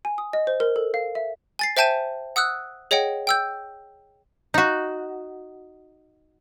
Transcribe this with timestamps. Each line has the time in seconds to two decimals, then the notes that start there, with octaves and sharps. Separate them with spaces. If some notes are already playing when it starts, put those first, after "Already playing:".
0.05 G#5
0.18 D#6
0.33 D#5
0.47 C5
0.60 A#4
0.76 A4
0.94 F5
1.15 E5
1.59 G#5 A6 C7
1.77 C5 E5 G5 A5 G6 D#7
2.36 F#5 D#6 E6 F#6
2.91 G#4 C#5 D#5 F#5 G5
3.27 G5 E6 G6
4.54 D#4 F#4